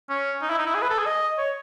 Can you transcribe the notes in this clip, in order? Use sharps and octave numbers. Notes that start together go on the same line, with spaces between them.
C#4
D#4
E4
D#4
E4
G#4
B4
A4
G#4
D#5
C#5